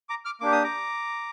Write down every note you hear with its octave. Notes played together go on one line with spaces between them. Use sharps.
A#5 D6
D6 F6
A#3 D4 G4 D6
D#6
A#5 D6